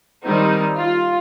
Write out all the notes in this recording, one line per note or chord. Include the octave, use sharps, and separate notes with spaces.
D#3 G3 C4 D#4
F4